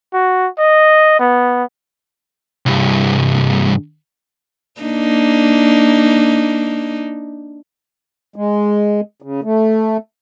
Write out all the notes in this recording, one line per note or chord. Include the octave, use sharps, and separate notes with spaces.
F#4
D#5
B3
C2 G2
A#3 D4 D#4
G#3
C#3
A3